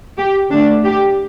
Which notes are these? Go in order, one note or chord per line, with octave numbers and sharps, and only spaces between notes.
G4
D3 A3 D4
G4